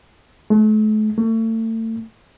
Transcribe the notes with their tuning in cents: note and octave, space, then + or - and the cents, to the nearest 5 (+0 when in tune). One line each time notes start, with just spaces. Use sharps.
A3 -40
A3 +35